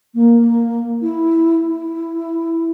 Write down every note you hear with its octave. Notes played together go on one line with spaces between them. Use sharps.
A#3
E4
E4